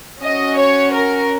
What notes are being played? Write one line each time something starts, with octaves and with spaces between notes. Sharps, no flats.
C#4 F#4 D#5
C#5
A#4